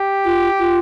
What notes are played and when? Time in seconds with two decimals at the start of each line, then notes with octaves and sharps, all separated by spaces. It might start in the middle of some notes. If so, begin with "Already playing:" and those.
Already playing: G4
0.25 F4
0.59 F4